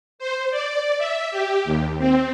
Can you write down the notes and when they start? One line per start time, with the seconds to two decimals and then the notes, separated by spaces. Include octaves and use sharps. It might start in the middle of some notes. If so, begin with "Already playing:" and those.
0.19 C5
0.51 D5
0.98 E5
1.31 G4
1.65 D#2
1.99 C4